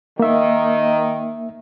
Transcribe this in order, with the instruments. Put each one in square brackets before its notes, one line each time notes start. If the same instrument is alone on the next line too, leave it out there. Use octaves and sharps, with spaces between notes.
[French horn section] D#3 [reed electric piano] A#3 E5